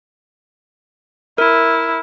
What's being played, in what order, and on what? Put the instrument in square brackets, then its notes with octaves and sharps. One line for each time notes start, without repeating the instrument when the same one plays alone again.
[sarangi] E4 [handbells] A#4